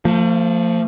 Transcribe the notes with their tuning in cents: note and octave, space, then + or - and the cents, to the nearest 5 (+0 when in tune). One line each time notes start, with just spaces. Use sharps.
F3 +0 A3 +45